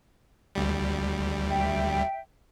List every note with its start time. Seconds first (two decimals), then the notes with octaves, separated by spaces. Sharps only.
0.55 D2 G3
1.50 E5 G5